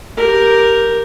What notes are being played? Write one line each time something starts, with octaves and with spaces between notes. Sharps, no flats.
G4 A#4